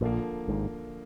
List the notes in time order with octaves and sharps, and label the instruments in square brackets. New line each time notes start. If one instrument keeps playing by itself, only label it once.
[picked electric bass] A#1 A#2 [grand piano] D3 F3 A#3
[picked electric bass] G#1 G#2